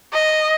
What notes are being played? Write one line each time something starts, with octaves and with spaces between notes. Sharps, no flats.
D#5